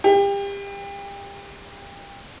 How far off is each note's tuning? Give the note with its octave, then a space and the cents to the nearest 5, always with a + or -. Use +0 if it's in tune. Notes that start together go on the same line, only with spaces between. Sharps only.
G4 +30